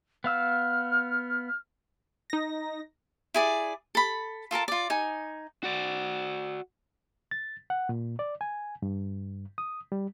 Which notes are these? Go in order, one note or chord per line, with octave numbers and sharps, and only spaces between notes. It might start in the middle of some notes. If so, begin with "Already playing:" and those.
B3 F5 E6 F6
D#4 A#6
E4 G#4 D5
A4 B5
F4 A4 A#4 A5
F4 D5
D#4 G#5
F#4 D5
A6
F#5
A#2
D5
G#5
G2
D#6
G3